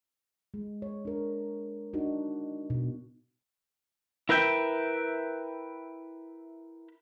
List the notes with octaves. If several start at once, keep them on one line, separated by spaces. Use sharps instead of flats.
G#3
C#5
D4 A#4
D4 D#4 F#4
B2
E4 A#4 B4 E5 G5